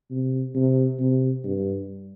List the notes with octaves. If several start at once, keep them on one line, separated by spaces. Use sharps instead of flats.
C3
C3
C3
G2